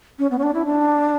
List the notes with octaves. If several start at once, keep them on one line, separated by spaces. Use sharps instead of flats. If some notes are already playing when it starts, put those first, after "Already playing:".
C#4
B3
C#4
D4
E4
D4